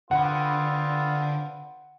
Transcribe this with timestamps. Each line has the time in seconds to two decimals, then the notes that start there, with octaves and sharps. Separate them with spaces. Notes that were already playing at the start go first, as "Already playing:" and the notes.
0.11 D3 B3 C4 F4 F#5